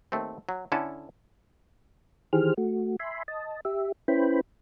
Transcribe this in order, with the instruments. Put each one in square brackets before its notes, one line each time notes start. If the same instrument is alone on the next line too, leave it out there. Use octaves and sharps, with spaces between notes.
[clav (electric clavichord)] D#2 A3 C4
F#3
D3 C#4 E4 A4 A5
[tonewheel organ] D#3 E3 G4 G#4 C5 F6
A3 F#4
E5 G#5 B5 C6
D#5 A5
G4 E5
C#4 E4 B4 C5 G5 B5